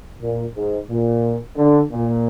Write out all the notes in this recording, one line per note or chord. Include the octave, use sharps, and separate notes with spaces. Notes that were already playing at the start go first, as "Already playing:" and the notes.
A#2
G#2
A#2
D3
A#2